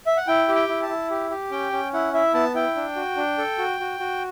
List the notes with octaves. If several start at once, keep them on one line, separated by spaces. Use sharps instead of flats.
E5
F#5
E4 G5
G4
G5
E4
A5
E4
G4
G4
C#4 G5
C#4
E4 F#5
E4 E5
B3 A5
E4 G5
D4
F#4
D4
A4
F#4
F#4
F#4